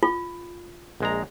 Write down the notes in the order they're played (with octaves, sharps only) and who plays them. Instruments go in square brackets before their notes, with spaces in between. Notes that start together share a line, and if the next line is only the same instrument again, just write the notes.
[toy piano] F4
[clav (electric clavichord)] A#1 G#3 A#5